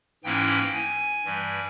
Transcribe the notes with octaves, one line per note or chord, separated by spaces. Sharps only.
G#2 E3 A#3 C#4 E4 G5
G#5
G2 E3 G3